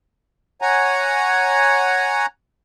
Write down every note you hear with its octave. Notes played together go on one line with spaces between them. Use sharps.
C#5 F#5 G#5 A#5